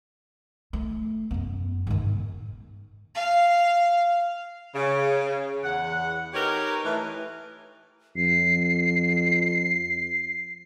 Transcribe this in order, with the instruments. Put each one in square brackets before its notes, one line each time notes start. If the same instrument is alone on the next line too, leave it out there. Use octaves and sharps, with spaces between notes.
[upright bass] A3
F#2 B3
G#2 D#3
[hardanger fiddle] F5
[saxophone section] C#3
E2 F#5
D#4 G4 A#4 B4 C#5
A2 E3
[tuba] F2 [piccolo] C7